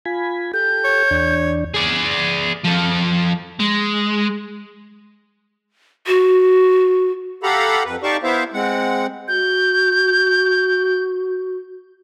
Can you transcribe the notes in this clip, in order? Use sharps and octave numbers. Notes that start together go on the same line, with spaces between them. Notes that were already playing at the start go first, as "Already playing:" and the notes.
F4 G#5 B5
G4 A4 G6
C#5
E2 D4
G#4 D5
F3 A4
G#3
F#4
G4 A4 F5 F#5 A#5 B5
F2 B4
D#4 G4 D5 F5 A5 C#6
B3 E4 C5 E5 F5
G#3 C4 F#5
F#4 G6